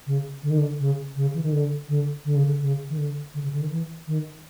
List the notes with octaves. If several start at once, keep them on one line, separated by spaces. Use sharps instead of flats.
C#3
D3
D#3
D3
C#3
C#3
E3
D#3
D3
D3
D3
C#3
D3
C#3
D#3
D3
D3
C#3
D3
D#3
E3
D#3